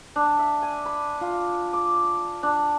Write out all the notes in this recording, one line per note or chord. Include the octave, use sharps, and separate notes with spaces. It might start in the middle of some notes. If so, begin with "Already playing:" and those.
D4
E5
G#5
B5
F4
D6
D4